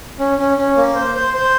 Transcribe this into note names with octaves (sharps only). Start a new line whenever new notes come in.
C#4
C#4
C#4
A#3
C5
C5
C5